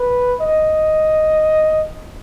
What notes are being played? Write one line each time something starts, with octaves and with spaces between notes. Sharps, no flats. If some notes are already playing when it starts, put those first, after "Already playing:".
Already playing: B4
D#5